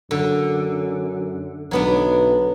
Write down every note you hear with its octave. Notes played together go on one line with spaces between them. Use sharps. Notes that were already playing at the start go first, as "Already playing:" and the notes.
F#2 D3
B1 F#3 B3 D4